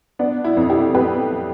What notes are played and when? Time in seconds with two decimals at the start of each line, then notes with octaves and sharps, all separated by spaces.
0.19 B3 D4
0.44 E4
0.57 F2
0.70 E4 G4
0.94 F2 G4 B4